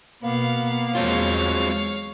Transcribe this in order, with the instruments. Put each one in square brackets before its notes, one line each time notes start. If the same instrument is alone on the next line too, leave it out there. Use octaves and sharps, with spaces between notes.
[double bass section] B2 [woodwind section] A#3 [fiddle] B3 F5
[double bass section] E2 G#3 [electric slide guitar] F#3 C4 F4 [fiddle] C#5 F5